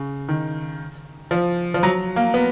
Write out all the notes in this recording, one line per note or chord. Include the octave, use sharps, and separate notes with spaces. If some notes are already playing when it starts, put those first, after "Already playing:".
Already playing: C#3
D#3
F3
F3
F#3
A#3
B3